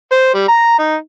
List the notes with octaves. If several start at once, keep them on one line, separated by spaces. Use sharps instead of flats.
C5
G3
A#5
D#4